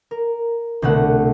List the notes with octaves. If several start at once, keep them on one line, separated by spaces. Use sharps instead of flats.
A#4
C2 B2 D3 A3 F#5